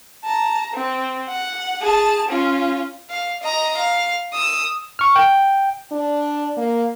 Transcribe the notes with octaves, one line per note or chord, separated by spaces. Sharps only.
A5 A#5
C4
F#5
G#4 A5
C#4 F4
F5
D#5 A#5
F5
D#6 E6
C#6 F6
G5
D4
A#3